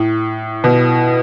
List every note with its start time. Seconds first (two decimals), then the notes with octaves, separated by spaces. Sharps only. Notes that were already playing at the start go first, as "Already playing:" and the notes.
Already playing: A2
0.64 B2